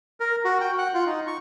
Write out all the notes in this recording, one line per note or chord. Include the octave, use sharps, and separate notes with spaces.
A#4
F#4
G5
F#5
F4
D#4
C#6